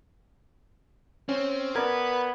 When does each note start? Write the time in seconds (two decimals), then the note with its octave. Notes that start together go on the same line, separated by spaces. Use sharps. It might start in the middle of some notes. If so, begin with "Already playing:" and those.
1.29 C4 C#4
1.76 B3 A#4 B4 D5 G#6